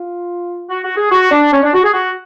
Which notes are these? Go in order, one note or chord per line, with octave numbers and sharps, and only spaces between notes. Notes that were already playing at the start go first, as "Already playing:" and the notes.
Already playing: F4
F#4
F#4
G#4
F#4
D4
C#4
D4
F#4
G#4
F#4